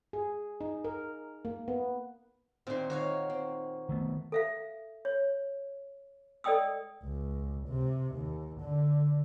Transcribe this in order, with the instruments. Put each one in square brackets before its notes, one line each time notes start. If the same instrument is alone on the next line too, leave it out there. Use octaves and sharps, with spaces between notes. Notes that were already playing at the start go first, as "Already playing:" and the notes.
[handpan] G#4
D#4
A#4
A#3
B3
[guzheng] A#2 D#3 [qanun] C4 C6
[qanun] D#3 [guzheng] F#4 C#5 F5
[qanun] C4
[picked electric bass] D#3 A3 B3
[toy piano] A4 E5 F5
C#5
A4 D5 D#5 G5 D#6 E6
[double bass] C#2
C3
D#2
D3